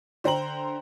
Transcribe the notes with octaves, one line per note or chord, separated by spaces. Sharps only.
D3 C5 G5 A#5 F#7